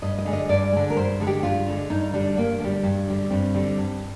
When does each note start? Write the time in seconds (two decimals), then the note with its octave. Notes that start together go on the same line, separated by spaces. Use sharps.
0.02 G2 D#5
0.18 D#5
0.25 D3 G#3
0.33 D#5
0.49 G2 D5
0.72 D3 G#3
0.90 A#4
0.96 G2 C5
1.20 D3 G#3
1.27 G4
1.43 G2 F4
1.67 D3 G#3
1.90 G2 D#4
2.13 D3 G3 D4
2.37 G2 A#3
2.60 D3 A#3
2.64 G3
2.83 G2
3.08 D3 G3
3.30 G2 C4
3.55 D3 G3
3.78 G2